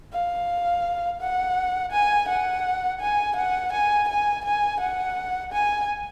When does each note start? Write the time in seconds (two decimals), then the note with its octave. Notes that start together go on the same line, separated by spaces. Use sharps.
0.13 F5
1.21 F#5
1.92 G#5
2.28 F#5
3.01 G#5
3.36 F#5
3.73 G#5
4.08 G#5
4.45 G#5
4.80 F#5
5.52 G#5